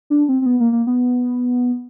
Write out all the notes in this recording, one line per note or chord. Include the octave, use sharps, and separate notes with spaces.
D4
C4
C4
B3
A#3
A#3
B3